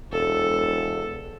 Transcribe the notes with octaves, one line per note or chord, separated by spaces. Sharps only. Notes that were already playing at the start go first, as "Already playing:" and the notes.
E1 A4